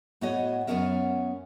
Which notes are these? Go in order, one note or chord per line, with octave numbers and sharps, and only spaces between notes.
A2 B3 F#4 C#5 D#5
F#2 F#3 B3 C#4 A#4 E5